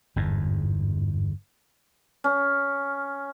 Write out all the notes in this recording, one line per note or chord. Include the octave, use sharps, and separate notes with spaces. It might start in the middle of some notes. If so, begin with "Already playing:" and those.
G1 E2 G#2
C#4